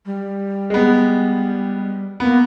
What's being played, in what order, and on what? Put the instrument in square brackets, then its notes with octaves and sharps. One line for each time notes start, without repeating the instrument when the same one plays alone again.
[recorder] G3
[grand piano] G#3 B3
[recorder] A#3 [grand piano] B3